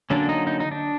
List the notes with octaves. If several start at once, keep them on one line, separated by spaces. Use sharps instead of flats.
D3 F#3 A#3 C#4 D4
D#4
D#4
D#4
D4